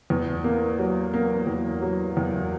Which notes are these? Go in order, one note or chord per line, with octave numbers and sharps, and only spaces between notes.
E2
A#3
F#3
A#3
E2
F#3
E2